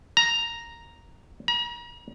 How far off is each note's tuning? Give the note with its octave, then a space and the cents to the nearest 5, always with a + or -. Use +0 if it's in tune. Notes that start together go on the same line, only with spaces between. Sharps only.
A#5 +0
A#5 +40